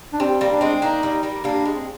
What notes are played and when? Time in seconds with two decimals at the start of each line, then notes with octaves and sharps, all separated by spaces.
0.13 D4
0.20 G3 C4
0.41 G3 A#3
0.51 D4
0.61 G#3 C4
0.82 A#3 D4 D#4
1.03 G3 A#3
1.23 G3 A#3
1.44 G3 A#3 D4
1.65 G#3
1.75 C4